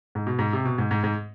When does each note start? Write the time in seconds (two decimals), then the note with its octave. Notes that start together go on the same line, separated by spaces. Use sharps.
0.15 G#2
0.27 B2
0.39 G#2
0.53 C3
0.65 B2
0.78 G#2
0.91 G#2
1.04 G#2